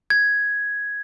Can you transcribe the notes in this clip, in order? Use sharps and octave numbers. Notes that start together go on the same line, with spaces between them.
G#6